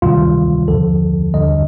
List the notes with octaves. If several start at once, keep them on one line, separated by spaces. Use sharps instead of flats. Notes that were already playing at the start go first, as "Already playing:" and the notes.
D2 C3 D#3 G3 F4
D#2 D3 F3 A4
D#2 D3 G3 D#5